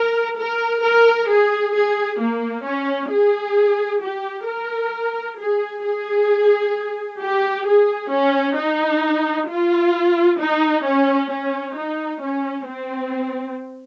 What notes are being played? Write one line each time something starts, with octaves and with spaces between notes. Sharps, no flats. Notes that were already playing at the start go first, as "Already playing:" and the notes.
Already playing: A#4
A#4
A#4
G#4
G#4
A#3
C#4
G#4
G4
A#4
G#4
G#4
G4
G#4
C#4
D#4
F4
D#4
C#4
C#4
D#4
C#4
C4